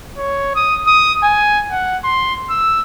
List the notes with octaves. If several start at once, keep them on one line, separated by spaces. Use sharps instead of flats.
C#5
D#6
D#6
G#5
F#5
C6
E6